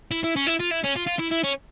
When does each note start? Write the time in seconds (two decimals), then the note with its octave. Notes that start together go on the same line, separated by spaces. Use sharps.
0.11 E4
0.24 E4
0.36 C#4
0.47 E4
0.60 F4
0.72 E4
0.84 C#4
0.97 F4
1.07 F4
1.19 E4
1.32 E4
1.44 C#4